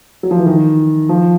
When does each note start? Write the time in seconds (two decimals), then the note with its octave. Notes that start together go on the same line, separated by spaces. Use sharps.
0.23 F#3
0.31 F3
0.38 E3
0.46 D#3
1.09 F3